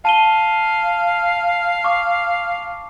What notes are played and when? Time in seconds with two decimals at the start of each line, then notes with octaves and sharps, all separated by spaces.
0.05 F5 A5 D#7 G7
1.84 C#6 D6